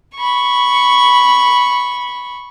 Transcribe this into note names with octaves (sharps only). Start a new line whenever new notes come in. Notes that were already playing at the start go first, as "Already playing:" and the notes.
B5 C#6